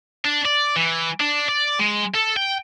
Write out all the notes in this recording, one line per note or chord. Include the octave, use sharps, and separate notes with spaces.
D4
D5
E3
D4
D5
G#3
A4
G5